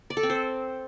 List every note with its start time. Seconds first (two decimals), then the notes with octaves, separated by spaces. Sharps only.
0.10 D5
0.17 A4
0.23 C4
0.30 C5